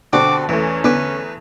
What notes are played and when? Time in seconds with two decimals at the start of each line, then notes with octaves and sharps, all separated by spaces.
0.13 B2 D3 C4 D4 F#4 G4 F#5 D6
0.49 E2 E3 A3 C#4
0.84 D3 B3 B4 G#5 D6